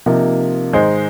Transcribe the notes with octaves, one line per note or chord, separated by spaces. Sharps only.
C3 F3 A#3 D#4
G#2 D#3 G#3 D#4 C5